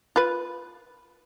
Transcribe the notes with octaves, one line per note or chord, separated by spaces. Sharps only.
F4 B4